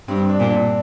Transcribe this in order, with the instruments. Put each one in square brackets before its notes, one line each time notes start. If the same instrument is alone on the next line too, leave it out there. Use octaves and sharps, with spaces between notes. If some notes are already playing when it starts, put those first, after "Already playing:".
[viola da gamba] G2 [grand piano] C4
[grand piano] D4
[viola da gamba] A#2
[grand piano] D4